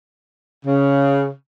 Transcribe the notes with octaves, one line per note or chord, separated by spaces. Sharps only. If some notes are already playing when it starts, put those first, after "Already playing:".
C#3